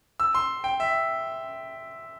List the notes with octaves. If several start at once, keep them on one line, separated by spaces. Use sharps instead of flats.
E6
C6
G5
E5